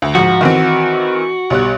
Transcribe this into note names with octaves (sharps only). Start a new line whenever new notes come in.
D2
G#2 F3 F#4
D#3 E3 C4
B1 G3 F#6